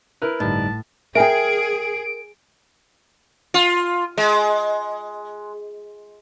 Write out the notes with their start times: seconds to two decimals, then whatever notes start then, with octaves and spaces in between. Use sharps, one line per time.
0.22 E4 A#4 B4
0.40 G1 A2 G3 D#4 A5
1.15 G#4 A#4 E5 G5 G#5 D7
3.54 F4
4.18 G#3